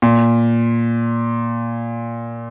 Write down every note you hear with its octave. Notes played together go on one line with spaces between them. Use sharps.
A#2